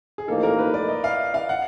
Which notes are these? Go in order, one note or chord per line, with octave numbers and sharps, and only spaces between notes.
G#4
A1 A2 F3 A#3 D#4 A4
A#4
B4
D5
D#5
F5
F5
F#5